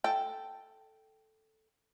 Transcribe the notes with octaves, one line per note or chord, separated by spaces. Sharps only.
A4 G5